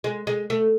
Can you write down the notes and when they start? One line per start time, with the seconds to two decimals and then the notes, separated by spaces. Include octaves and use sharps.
0.04 G#3
0.27 G#3
0.50 A3